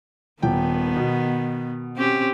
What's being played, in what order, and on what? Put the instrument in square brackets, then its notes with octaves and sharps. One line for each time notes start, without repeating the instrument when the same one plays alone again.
[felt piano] D#1 G5 [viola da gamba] D#3 B3
[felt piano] B2
[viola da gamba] C4 C#4 G4